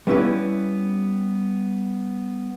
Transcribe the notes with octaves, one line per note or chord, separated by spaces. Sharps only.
G3 B3 C#4 E4 B4